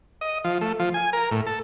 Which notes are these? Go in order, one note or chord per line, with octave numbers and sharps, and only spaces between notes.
D#5
F3
A3
F3
G#5
A#4
A2
A4